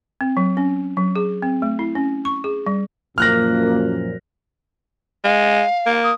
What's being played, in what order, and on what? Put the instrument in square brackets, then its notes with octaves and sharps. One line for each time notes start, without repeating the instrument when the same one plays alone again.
[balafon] C4
F#3
C#4
F#3
G#4
C4
A3
E4
C#4
C#6
G#4
G3
[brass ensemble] F#2 A#2 F3 [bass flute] A#3 [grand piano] F6 F#6 A#6
[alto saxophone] G#3 [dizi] F5
[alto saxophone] A#3
[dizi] D#6